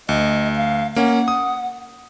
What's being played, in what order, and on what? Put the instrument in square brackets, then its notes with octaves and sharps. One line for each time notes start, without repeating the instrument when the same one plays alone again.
[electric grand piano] D2 [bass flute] D#5
[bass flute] F5
[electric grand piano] A#3 C#4 [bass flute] F#5
[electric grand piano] D#6